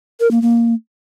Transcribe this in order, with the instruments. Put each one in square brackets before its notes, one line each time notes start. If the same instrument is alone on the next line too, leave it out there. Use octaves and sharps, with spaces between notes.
[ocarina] A#4
A#3
A#3